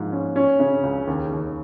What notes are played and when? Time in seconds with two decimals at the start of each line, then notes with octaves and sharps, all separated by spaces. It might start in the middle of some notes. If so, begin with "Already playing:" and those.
Already playing: G#2 F3 A#3
0.12 C#4
0.36 C#4
0.60 C#3
0.83 C#2
1.07 D#2
1.32 D#2